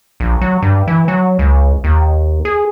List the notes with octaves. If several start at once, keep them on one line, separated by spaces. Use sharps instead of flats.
A#1
F#3
G2
E3
F#3
C#2
D#2
G#4